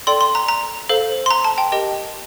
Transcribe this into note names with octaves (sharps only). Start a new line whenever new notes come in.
A4 D5 G5 C6
C6
A#5
A#5
A4 C5 F5
C6
A#5
A5
G5
G4 A#4 D#5 G5